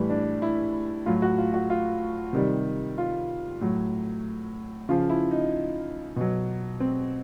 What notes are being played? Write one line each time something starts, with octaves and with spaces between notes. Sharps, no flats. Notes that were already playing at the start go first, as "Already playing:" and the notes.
Already playing: A2 E3 G3
D4
E4
A2 F#3 F4
F#4
F4
F#4
F4
C3 D#3 G3
F4
A2 F#3
C#3 F3 F4
E4
D#4
B2 F#3
C4